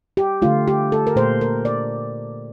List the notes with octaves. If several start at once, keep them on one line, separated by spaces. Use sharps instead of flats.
G4
D3 A3 F4
G4
A4
A#4
A#2 A3 C5
A#4
D5